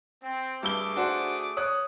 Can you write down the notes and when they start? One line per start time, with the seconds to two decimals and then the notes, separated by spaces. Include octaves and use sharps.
0.22 C4
0.63 G2 A3 G#4 D6 E6 G7
0.96 D4 F#4 C5
1.57 C#5 D#6 F#6